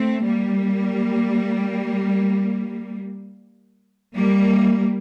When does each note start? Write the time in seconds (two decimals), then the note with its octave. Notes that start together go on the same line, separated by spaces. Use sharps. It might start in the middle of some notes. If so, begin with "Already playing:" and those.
Already playing: A3 C4
0.24 G3 A#3
4.15 G3 A#3